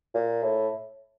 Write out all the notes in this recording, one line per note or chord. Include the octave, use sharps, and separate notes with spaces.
A#2
A2